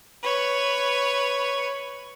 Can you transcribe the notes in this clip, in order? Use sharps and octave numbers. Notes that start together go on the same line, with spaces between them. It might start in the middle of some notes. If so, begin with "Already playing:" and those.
B4 C#5